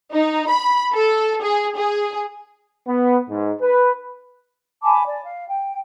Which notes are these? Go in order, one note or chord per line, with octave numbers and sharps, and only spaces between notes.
D#4
B5
A4
G#4
G#4
B3
G#2
B4
G#5 A5 B5 D6
D5
F5
G5